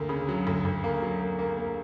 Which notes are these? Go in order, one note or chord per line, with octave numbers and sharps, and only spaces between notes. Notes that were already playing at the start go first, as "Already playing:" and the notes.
Already playing: D2 A#3
C#3
F#3
D2
D2
A#3
F#3
A#3
A#3
A#3